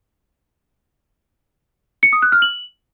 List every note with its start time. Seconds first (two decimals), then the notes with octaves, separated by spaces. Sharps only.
2.03 C#7
2.13 D#6
2.22 F#6
2.32 F6
2.42 F#7